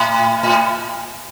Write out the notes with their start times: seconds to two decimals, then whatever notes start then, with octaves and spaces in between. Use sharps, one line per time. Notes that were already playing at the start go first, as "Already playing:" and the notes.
Already playing: A2
0.43 A2